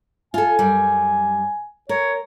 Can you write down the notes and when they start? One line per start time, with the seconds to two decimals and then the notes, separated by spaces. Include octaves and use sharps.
0.34 F4 A4 G#5
0.59 F#2 G3
1.89 A#4 C#5